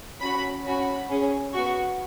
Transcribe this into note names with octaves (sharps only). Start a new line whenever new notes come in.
C#4 F#4 B5
C#4 F#4 B5
C#4 G#4
B3 F#4 C#6